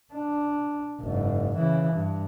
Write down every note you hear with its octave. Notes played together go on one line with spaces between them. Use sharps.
D4
F#1 G#2
C#3 E3
G2